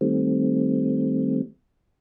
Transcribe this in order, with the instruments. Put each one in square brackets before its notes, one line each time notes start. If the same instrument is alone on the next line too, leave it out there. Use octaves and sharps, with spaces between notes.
[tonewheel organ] D#3 G3 A3 C4